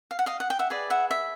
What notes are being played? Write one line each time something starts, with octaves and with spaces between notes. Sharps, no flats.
F5
F#5
D#5 F5
F#5
G5
E5 F#5
G#4 B4 D5
E5 F#5
E5